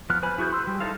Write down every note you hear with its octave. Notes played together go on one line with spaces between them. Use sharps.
F3 B3 F6 F#6
B4 C5 G#5 B5
E4 F#4 G#4 F#6 G6
C6 E6
G3
D#4 E4 A4 C5 F5